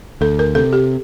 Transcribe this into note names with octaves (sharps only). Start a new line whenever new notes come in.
D2 A4
A#4
C3 A4
G4